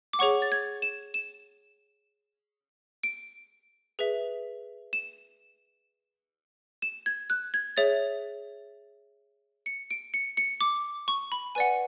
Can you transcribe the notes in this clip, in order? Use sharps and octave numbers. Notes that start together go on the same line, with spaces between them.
D6
G#4 C#5 F#5 C#6
A6
G#6
E7
E7
D7
G#4 B4 E5
E7
E7
G#6
F#6
G#6
G#4 C#5 E5 A6
C#7
D7
C#7
C#7
D6
C#6
B5
B4 D5 F#5 G#5